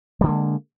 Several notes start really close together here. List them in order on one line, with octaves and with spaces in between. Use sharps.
G3 D3 A#3 G#3